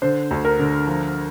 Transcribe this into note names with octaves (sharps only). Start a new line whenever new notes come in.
D3 C5
D2
A#4
D3
F3